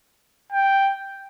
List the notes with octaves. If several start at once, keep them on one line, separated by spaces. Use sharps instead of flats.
G5